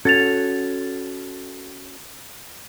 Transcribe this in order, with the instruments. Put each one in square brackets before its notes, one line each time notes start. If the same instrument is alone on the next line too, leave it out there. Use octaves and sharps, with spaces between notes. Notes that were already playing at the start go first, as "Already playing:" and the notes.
[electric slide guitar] C#4 F#4 A4 [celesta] G#6 A6 F7